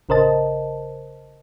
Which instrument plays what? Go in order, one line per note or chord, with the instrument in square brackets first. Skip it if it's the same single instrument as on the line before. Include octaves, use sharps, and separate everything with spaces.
[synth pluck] A1 C#3 A#4 C5 D#5 A5